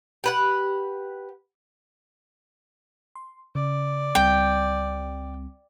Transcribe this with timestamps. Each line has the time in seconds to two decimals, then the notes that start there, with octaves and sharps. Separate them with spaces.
0.24 G4 B4 F#5
3.15 C6
3.55 C#3 D5
4.15 C#2 G3 C4 G5